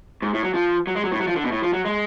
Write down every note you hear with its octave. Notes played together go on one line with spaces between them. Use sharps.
G#2
A2
F#3
F3
F#3
G#3
F#3
A2
F#3
F3
D3
B2
A2
F3
F#3
G#3